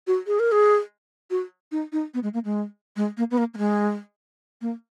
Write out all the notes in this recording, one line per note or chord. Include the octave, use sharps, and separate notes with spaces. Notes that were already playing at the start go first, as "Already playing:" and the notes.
F#4
G#4
A#4
G#4
F#4
D#4
D#4
B3
G#3
A#3
G#3
G#3
A#3
B3
A#3
A#3
G#3
A#3